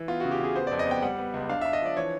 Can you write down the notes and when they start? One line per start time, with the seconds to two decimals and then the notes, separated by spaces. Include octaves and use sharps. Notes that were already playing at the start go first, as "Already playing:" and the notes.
Already playing: E3
0.08 B3 F4
0.20 C#3 F#4
0.31 G4
0.40 C#3 G#4
0.56 B3 C5
0.67 F2 D5
0.79 D#5
0.87 B3 G5
1.02 G3 F#5
1.18 B3
1.34 C#2
1.49 D4 F5
1.61 D4 E5
1.73 D#5
1.82 F3 D5
1.97 E3 C#5